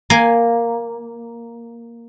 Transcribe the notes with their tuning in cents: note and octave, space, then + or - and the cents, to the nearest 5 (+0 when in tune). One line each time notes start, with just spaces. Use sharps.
A#3 +0 G#5 +0